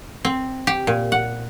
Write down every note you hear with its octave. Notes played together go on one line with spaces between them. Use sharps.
C4
G4
A#2
F#5